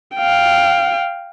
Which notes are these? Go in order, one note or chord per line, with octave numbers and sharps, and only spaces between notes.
F5 G5